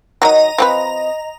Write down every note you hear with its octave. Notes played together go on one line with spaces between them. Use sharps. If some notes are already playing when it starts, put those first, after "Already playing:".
D#3 F#3 D#5 A#5
F3 C4 B4